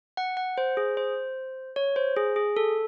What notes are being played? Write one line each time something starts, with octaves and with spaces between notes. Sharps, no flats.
F#5
F#5
C5
G#4
C5
C#5
C5
G#4
G#4
A4